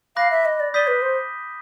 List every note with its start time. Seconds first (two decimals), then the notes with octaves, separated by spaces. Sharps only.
0.16 F5 B5 D6 F#6 A#6
0.31 E5
0.45 D#5
0.60 D5
0.74 D5 D#6 G6 B6 D#7 G7
0.88 B4
1.02 C5